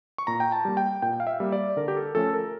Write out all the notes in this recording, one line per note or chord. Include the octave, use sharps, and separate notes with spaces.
C#6
A#2 A#5
G5
A5
G3 A#3
G5
A#2 G5
F5
E5
G3 A#3
D5
D3 A#4
G4
A4
F3 A3 C#4 A4
A#4